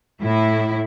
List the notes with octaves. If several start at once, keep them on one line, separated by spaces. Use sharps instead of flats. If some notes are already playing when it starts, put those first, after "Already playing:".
A2 E4